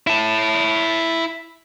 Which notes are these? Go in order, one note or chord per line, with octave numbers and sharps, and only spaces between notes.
E4 A5